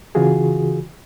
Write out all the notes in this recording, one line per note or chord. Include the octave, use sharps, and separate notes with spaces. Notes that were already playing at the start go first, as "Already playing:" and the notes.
C#3 E3 F4 F#4 G#4